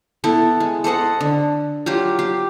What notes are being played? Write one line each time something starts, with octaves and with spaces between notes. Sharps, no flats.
B3 E4 A4
G#3
A4 C5 D#5 F#5
D3
F#3 F4 G4
G4